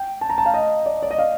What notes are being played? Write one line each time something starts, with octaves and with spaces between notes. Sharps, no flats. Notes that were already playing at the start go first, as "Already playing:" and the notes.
Already playing: G5
A5
A#5
A5
F5
D#5
D5
D5
D#5
F5